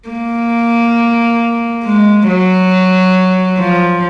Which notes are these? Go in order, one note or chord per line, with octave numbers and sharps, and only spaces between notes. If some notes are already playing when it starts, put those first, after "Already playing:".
A#3
G#3
F#3
F3